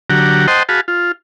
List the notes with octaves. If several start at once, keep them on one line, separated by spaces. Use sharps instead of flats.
D3 F#3 G4 F#5 A#5
C5 D#5 F#5 G5 A5 C6
F#4 G#4 F5 A5 B5
F4